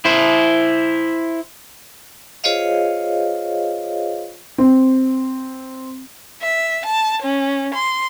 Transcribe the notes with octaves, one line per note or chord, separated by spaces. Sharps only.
E4 C5
F4 G#4 C5 C#5 D#5 F5
C4
E5
A5
C#4
C6